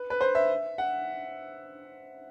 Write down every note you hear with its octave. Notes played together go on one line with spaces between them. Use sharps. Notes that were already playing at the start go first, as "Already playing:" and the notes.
Already playing: B4
B4
C5
E5
F#5